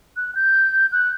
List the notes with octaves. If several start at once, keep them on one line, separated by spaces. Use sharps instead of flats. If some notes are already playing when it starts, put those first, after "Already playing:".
F#6
G6
F#6